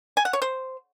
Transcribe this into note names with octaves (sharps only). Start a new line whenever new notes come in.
G#5
F#5
C#5
C5